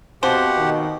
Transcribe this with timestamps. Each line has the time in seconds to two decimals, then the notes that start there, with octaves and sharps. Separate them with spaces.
0.23 B2 F3 C4 G4 C5 F#5
0.58 D#3